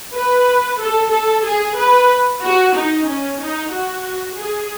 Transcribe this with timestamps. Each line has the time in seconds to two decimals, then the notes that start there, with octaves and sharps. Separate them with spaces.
0.16 B4
0.79 A4
1.12 A4
1.45 G#4
1.78 B4
2.43 F#4
2.75 D#4
3.07 C#4
3.40 D#4
3.72 F#4
4.37 G#4